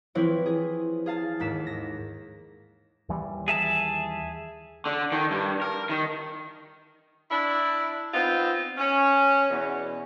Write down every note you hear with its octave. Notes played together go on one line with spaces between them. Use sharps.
E3 F3 C4 E4 B4 C#5
G#4
G#4 F5 A5
D#2 G#2 B6 E7
A#6
D#2 E3 G3
G#4 E5 A5
D3
D#3
G2
A#4
D#3
D4 E4
B3 C4 D#4 F4
C#4
E2 B2